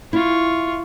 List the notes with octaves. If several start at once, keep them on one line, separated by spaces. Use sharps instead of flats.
E4 F4 C#6